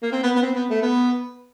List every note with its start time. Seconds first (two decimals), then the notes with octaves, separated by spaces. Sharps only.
0.02 A#3
0.12 C4
0.23 B3
0.35 B3
0.42 C4
0.55 B3
0.70 A3
0.82 B3